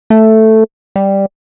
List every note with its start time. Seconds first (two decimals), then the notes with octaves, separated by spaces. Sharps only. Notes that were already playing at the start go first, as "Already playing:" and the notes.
0.10 A3
0.96 G3